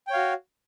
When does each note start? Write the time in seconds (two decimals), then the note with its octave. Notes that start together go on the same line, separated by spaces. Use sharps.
0.07 G5
0.10 C#5
0.13 F5
0.16 F#4